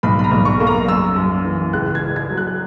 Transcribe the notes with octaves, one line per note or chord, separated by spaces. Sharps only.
B1 B5
B5
A#5
B1
C#6
A#3
A#5
F#2 E6
F#2
E3
C#2 F#6
G#6
C#2
G#6
F#3
F#6